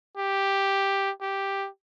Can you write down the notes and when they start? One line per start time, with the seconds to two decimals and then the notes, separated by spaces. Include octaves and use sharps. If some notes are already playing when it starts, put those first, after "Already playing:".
0.17 G4
1.21 G4